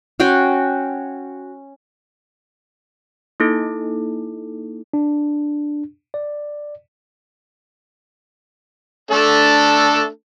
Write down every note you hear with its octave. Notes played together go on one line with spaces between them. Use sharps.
C#4 F#4 G5 C6
A#3 D#4 E4 A4
D4
D5
A3 D4 A4